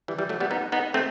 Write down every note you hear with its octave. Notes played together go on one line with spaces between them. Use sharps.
E3 G3
E3 G3
F#3 A3
G3 B3
B3 D#4
B3 D#4
A3 C4